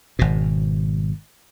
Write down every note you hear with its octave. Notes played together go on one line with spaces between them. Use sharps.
G#1 B2